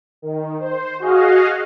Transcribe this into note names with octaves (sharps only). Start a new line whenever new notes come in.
D#3
C5
F#4 G#4 D#5 F5